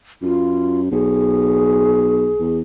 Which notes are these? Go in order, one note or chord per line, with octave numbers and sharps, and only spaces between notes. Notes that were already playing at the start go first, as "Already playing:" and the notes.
F#2 F4
B1 G#4
E2